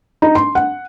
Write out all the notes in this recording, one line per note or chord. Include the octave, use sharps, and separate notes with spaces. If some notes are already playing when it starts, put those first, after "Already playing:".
D#4
C6
F#5